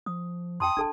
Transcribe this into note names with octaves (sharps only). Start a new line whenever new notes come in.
F3 D#6
F2 G5 A5 C6 D#6
D#1 D4 A4 A5